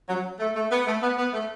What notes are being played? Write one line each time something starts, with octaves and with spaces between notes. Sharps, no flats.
F#3
A3
A3
B3
A3
B3
B3
A3